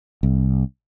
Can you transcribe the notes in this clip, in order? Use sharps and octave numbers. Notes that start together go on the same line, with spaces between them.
C2